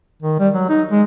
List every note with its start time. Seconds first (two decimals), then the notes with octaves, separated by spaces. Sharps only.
0.22 D#3
0.39 G3
0.54 F#3
0.69 D#4
0.91 G#3